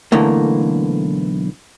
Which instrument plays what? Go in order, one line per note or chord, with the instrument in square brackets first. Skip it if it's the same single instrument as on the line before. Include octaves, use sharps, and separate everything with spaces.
[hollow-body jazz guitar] B1 D3 E3 A3 A#3